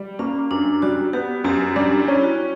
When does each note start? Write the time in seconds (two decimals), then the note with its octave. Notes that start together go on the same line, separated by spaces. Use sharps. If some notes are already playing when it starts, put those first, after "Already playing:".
Already playing: G3
0.19 A#3 C#4
0.51 F#2 D4
0.82 G3 F#4
1.13 B3 G4
1.44 F#2 G4
1.76 G3 D4
2.00 E4
2.08 C#4
2.23 F#4